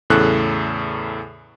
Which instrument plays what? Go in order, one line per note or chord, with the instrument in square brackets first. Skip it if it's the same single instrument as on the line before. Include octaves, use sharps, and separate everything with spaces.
[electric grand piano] E2 A2 C#3 A4 F#6